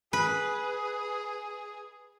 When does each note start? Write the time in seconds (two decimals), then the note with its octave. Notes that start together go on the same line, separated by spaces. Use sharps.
0.13 G#4 B4